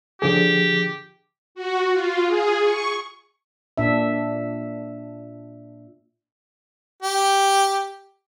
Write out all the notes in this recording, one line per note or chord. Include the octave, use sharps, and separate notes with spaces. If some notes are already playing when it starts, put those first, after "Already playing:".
D3 F3 G4 G#4
F#4
F4
G#4
C#6
A#2 D4 E5
G4